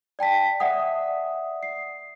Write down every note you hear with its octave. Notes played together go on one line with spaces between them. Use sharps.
D5 G5 A5 B6
D5 E5 F#5 D#6
C7